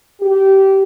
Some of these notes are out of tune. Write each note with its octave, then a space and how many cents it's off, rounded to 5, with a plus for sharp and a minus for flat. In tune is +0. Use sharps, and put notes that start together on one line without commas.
G4 -20